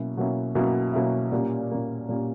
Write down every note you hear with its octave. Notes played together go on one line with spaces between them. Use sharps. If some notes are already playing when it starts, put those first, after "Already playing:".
Already playing: B2 F#3 A#3 C#4 E4
B2 F#3 A#3 C#4 E4
B2 F#3 A#3 C#4 E4
B2 F#3 A#3 C#4 E4
A#2 G3 A#3 C#4
A#2 G3 A#3 C#4
A#2 G3 A#3 C#4